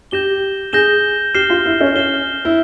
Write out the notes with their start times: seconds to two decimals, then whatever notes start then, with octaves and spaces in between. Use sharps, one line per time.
0.11 G4 G6 A#6 E7 G7
0.73 G#4 G6 A#6 E7 G7
1.34 G4 F6 C7 E7 G7
1.50 F4
1.66 E4
1.81 C#4
1.95 C#4 F6 C7 E7 G7
2.45 E4